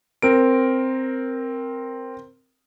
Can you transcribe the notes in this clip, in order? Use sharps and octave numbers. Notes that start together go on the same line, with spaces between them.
C4 A#4 D7